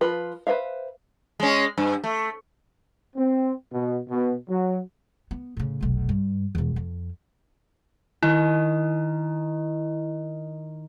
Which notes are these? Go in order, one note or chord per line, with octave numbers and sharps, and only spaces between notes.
F3 F4 B4
B4 C5 E5 F5
G#3 C#4
G2
A3
C4
B2
B2
F#3
B3
A2 C#3
F1 B1
G2
E1 E2
F2
D#3 E4